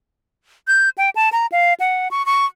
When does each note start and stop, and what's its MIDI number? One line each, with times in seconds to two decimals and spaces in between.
0.68 0.89 91
0.98 1.10 79
1.16 1.29 81
1.32 1.46 82
1.52 1.74 77
1.80 2.08 78
2.11 2.25 85
2.26 2.46 85